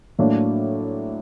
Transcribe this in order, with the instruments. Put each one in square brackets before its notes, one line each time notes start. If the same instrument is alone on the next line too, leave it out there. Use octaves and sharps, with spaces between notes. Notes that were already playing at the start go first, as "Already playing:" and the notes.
[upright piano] A2 F#3 A#3 D4